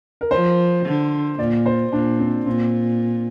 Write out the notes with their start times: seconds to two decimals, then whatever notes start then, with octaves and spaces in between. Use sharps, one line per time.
0.21 A#4
0.31 F3 C5
0.86 D3
1.39 A#2 D5
1.66 C5
1.92 A#2 D4
2.20 C4
2.46 A#2 C4